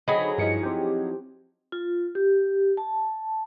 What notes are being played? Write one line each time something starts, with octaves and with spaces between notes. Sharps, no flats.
D3 F#3 C4 D#4 G#4 D#5 B5
G2 F3 D#4 E4 C#7
C4 G4
F4
G4
A5